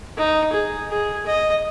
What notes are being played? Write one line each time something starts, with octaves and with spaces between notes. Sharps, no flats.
D#4
G#4
G#4
D#5